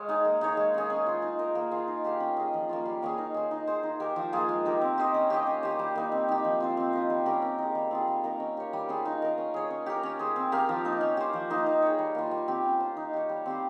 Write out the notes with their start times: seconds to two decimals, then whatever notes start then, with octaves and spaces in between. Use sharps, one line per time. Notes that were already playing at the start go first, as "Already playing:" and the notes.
Already playing: G#3 C#5 F5
0.09 D#4 G#4
0.25 A#3
0.41 D#4 G#4 C#5
0.57 G#3
0.74 C#4 G#4
0.90 C#4
1.07 F4 C5
1.22 D#4
1.39 A#4 D#5
1.55 A#3
1.71 F4 G#4
1.88 D#4
2.04 G4 C5 F5
2.20 C#4
2.37 G#4 D#5
2.54 F3
2.69 A#3 C#4 F4
2.85 G3
3.02 A#3 C#4 G#4
3.18 D#4
3.34 G#4 C5
3.51 D#4
3.67 G#4 C5
3.83 D#4
4.00 G4 A#4
4.16 F3
4.33 A#3 F4 G#4
4.49 G#3
4.65 D#4 G4 A#4
4.81 C4
4.98 G4 C5 D#5
5.14 C#4
5.30 G4 C5 D#5
5.47 C#4
5.63 G4 C5
5.79 G3
5.95 A#3 D#4
6.12 C4
6.29 D#4 G4
6.44 F3
6.60 C4 F4 C5
6.77 C4
6.93 F4 C5 D#5
7.10 G3
7.26 C#4 G4 A#4
7.42 C4
7.58 D#4 G#4
7.75 G3
7.91 C4 F4 G#4
8.07 G3
8.24 A#3 D#4 A#4
8.40 C#4
8.57 G4 C#5
8.73 G3
8.89 C#4 F4 G#4
9.05 D#4
9.22 A#4 D#5
9.38 C#4
9.54 G#4 C#5
9.70 C#4
9.86 G4 A#4
10.03 C#4
10.19 G#4 C5
10.36 C4
10.52 G4 A#4 F5
10.69 F3
10.85 A#3 D#4
11.01 C#4
11.17 G4 C5
11.33 F3
11.50 A#3 D#4
11.66 D#4
11.82 G#4 C#5
11.99 G3
12.15 A#3 F4
12.31 G3
12.48 C4 G4
12.64 C#4
12.80 F4 C5
12.97 D#4
13.13 G4 C#5
13.29 G3
13.46 C4 G4 C5